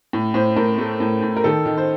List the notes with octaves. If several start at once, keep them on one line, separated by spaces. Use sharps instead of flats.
A2
A2 C5
A2 A#4
A3
A2
A2
A#4
D#3 A4
D#3
C5